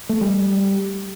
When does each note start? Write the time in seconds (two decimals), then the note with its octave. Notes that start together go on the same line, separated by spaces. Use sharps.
0.09 A3
0.21 G3